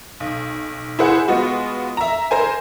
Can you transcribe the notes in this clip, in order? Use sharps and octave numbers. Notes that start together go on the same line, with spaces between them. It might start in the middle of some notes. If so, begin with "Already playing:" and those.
B1
E4 G#4 C5 F#5
G#3 B3 F4 F#4
E5 A#5
A#4 C5 G#5